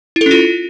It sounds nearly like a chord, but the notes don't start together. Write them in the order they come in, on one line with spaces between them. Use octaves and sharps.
E4 A4 C#4 F4